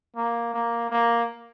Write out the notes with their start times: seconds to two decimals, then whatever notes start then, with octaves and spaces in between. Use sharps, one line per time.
0.16 A#3
0.54 A#3
0.90 A#3